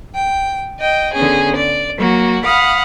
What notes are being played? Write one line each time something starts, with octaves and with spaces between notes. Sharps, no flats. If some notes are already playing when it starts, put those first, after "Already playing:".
G5
D#5 G5
D3 B3 C#4 G#4
D5
F#3 A#3 F#4
F5 F#5 B5 D#6